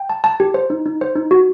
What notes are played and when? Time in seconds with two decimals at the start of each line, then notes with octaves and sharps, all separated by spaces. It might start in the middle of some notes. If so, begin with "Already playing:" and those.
Already playing: G5
0.10 A5
0.24 A5
0.40 G4
0.54 C5
0.70 D#4
0.86 D#4
1.01 C5
1.16 D#4
1.31 F#4